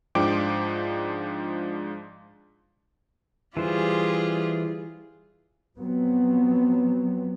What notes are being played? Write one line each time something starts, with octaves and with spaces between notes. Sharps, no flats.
G#2 F3 D4 G5 D6 D7
E3 G3 F4 G#4 C5
F3 F#3 B3 C4